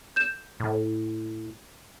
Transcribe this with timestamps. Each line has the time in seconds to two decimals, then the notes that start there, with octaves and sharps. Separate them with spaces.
0.16 G6 E7
0.60 A2